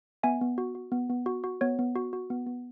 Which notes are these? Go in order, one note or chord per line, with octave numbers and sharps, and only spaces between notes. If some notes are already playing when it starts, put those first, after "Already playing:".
B3 E5 G#5
B3
F#4
F#4
B3
B3
F#4
F#4
B3 C#5
B3
F#4
F#4
B3
B3